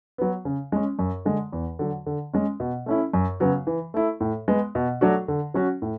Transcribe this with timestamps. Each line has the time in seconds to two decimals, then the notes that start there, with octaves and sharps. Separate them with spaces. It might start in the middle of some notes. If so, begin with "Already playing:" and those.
0.18 F#3 B3
0.45 C#3
0.72 G#3 C#4
0.99 F#2
1.25 D3 G#3
1.53 E2
1.79 D3 F#3
2.06 D3
2.33 G#3 C#4
2.60 B2
2.86 A3 C#4 E4
3.13 F#2
3.40 C#3 F#3 B3
3.67 E3
3.94 A3 E4
4.21 A2
4.48 G#3 B3
4.75 B2
5.01 F#3 A3 D4 F#4
5.28 D3
5.54 F#3 C#4 F#4
5.82 A2